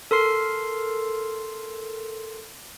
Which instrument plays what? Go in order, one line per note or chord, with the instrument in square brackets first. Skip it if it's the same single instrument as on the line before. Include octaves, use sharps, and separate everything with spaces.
[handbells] A4 A#4 C6 C7